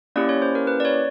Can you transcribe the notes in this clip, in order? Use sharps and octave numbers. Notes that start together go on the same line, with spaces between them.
A#3 C#4 E4 G4 D5
C#5
C5
A#4
B4
D5
C#5